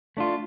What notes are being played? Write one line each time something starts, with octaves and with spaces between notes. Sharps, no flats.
A3 D4 F4